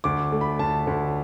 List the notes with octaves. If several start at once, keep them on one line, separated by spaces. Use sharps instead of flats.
D2 D6
A3
B5
D2 A5
D2